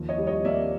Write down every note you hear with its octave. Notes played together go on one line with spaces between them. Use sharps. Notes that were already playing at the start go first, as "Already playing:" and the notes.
Already playing: D#2 F3
C#5 D#5
G3
C#5 D#5
A#3 D5 E5